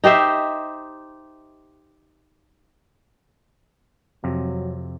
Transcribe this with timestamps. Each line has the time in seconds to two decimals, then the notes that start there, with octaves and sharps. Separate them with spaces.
0.04 D#4 G4 C5 E5
4.24 F2 C3 F#3